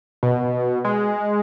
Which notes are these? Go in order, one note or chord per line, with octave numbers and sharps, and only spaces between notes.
B2
G#3